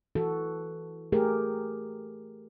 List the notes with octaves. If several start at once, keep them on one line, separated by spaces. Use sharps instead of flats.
E3 F#4 A4
A3 G4 G#4 A#4